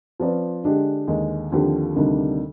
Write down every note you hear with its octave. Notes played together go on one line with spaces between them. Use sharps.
F3 C4 F4 B4 D5
D3 G#3 D4 G4
D#2 D3 G#3
D#2 D3 F3 C4 G4
D2 C3 D#3 G3 D4